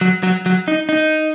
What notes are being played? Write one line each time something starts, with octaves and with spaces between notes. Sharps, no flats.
F#3
F#3
F#3
D#4
D#4